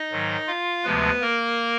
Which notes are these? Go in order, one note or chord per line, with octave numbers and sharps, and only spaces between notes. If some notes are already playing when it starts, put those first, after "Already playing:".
Already playing: D#4 D#5
G#2 D#3 F#3
F4 F5
D2 C3 F3 G#3 B3 B4
A#3 A#4